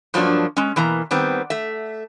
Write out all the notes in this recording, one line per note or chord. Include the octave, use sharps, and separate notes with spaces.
G2 F3 F#3 A#3 D4
G#3 C#4
B2 E3 A#3 A#5
D#3 G3 B3 C4
A3 E5